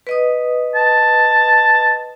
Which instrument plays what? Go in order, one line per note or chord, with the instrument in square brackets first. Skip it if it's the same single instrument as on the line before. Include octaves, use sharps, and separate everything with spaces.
[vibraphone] B4 D#5 D#6
[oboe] A5